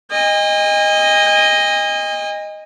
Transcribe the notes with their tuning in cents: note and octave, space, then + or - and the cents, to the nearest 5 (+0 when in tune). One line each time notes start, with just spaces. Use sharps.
D#5 +0 G#5 -40